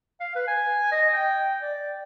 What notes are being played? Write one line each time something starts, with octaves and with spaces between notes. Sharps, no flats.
F5
B4
G#5
D#5
G5
D5